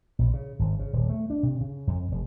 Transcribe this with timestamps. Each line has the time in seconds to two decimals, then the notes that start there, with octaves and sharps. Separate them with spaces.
0.19 A#1
0.34 C#3
0.59 G#1
0.79 C#3
0.93 D#1
1.10 A3
1.30 D4
1.43 C3
1.60 C#3
1.87 F2
2.12 F1